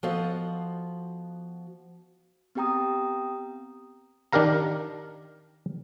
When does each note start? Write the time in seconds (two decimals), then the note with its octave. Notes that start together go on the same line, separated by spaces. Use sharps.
0.03 F3 B3 F#4 A4 C5 D#5
2.55 B3 C4 G4 G5 A#5 D#6
4.33 D#3 D4 G4 A#4 F5 A#5